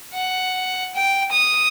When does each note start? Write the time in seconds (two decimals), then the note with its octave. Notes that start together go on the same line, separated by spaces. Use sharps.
0.14 F#5
0.96 G5
1.31 D#6